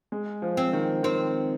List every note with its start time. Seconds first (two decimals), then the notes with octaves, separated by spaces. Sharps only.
0.12 G#3
0.42 F3
0.57 C4
0.73 D#3
1.03 D#3 C4